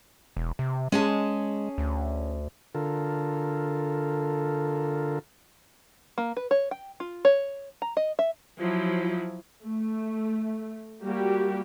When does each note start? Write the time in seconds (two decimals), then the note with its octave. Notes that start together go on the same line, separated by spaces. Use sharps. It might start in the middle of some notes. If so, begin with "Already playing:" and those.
0.37 E1
0.59 C3
0.92 G#3 C#4 G#4 A5
1.78 D2
2.75 D3 F4 A4 A#4
6.18 A#3
6.37 B4
6.51 C#5
6.71 G5
7.00 F4
7.25 C#5
7.82 A#5
7.97 D#5
8.19 E5
8.60 F3 F#3 E4
9.66 A3
11.02 G3 A#3 F#4 G4